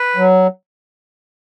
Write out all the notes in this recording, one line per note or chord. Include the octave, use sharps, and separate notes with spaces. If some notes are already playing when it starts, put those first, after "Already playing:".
Already playing: B4
F#3